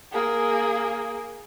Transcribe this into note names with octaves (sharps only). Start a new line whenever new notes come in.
A#3 G#4